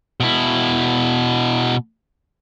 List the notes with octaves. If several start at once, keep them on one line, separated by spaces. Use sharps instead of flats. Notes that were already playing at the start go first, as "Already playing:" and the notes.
B2 E4